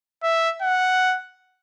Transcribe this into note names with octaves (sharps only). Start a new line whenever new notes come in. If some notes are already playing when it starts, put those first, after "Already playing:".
E5
F#5